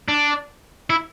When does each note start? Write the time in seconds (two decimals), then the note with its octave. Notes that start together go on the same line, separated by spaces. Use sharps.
0.08 D4
0.90 E4